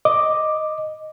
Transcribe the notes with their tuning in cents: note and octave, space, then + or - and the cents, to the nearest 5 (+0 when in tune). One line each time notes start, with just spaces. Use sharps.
D#5 +0 D6 +5